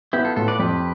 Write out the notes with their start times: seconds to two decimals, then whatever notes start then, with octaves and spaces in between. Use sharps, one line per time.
0.13 B3 E4 G4
0.25 F4 A4
0.36 A2 F4 A4
0.48 B4 D5
0.59 F2 G4 B4